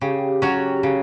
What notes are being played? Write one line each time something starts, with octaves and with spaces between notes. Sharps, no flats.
C#3 G4
F#3 C#4 F#4 C#5
C#3